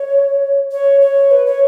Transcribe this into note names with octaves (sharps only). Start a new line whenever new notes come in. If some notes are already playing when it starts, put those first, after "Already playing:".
Already playing: C#5
C#5
C#5
B4
C#5